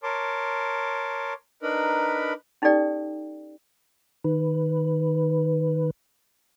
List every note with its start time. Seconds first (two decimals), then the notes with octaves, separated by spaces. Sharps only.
0.03 A#4 C#5 A5 C6 D6
1.62 D4 D#4 A#4 B4 B5
2.62 C#4 D#4 G4 A4 D5 G5
4.24 D#3 B4